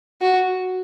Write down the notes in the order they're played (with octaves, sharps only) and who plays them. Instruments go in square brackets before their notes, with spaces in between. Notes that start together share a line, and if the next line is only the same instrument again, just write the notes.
[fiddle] F#4